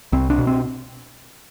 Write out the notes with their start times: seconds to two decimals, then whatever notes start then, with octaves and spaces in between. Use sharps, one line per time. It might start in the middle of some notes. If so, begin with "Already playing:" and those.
0.12 C2 C4
0.30 D4
0.38 B2
0.47 C4